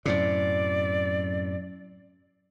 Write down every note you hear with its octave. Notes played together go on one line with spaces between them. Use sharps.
F#2 A2 C3 D5